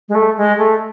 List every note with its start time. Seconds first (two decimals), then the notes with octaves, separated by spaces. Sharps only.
0.09 G#3
0.15 A3
0.37 G#3
0.58 A3